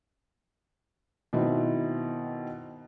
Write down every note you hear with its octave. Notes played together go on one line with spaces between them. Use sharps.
B2 D#3 C4 E4